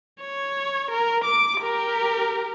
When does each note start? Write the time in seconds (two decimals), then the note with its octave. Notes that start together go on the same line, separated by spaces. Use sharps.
0.21 C#5
0.91 A#4
1.25 D6
1.58 G4 A#4